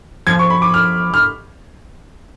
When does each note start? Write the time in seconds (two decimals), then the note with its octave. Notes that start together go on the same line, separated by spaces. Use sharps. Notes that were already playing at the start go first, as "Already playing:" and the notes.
0.27 F3 G#6
0.39 C#6
0.50 B5
0.62 D6
0.74 F6
1.14 F6